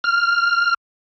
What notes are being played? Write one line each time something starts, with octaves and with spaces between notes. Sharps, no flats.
F6